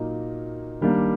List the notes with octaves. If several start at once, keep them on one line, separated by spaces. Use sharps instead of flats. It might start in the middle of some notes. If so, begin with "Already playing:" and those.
Already playing: A#2 F#3 A#3 D#4
D#3 G3 A#3 D4